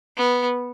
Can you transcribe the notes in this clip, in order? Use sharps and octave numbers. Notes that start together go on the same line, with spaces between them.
B3